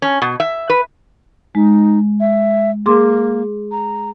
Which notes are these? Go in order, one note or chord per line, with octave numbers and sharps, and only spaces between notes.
C#4
B2
E5
B4
G#3 D#4
E5
A#3 G#4 C6 D6
A#5